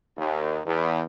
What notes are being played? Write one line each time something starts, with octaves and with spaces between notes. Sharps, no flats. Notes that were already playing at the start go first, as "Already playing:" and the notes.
D#2
E2